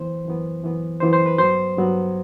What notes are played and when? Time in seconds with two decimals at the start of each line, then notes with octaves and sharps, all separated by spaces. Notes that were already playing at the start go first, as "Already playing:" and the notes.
Already playing: F#2 E3 B3 C5
0.25 F#2 E3 B3
0.63 F#2 E3 B3
1.00 F#2 E3 B3 C5
1.13 C5
1.26 B4
1.38 G2 F#3 B3 C5
1.77 G2 F#3 B3